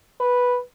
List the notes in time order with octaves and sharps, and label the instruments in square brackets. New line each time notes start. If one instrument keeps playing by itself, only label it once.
[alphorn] B4